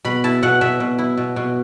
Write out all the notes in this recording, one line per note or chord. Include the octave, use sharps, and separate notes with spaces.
B2 B5
E4 A5
B2 F#5
B2 E5
B2
E4
B2
B2